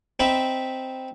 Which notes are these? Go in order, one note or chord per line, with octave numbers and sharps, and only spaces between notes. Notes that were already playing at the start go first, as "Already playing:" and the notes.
C4 D#4 E5 B5